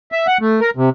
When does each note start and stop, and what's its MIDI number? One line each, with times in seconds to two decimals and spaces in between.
0.12 0.27 76
0.27 0.38 78
0.41 0.60 57
0.61 0.70 70
0.77 0.90 48